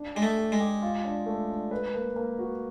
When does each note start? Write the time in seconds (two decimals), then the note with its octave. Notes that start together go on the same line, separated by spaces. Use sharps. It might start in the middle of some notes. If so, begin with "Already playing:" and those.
Already playing: D4
0.15 G#3 G4
0.22 A3
0.37 G4
0.52 G#3
0.60 G4
0.82 F4
1.04 D4
1.26 A3
1.49 D4
1.71 B4
1.94 A#3
2.16 A#3
2.39 F#4